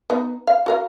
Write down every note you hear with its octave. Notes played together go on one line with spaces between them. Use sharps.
B3 D#4
F5
F#4 A#4 F5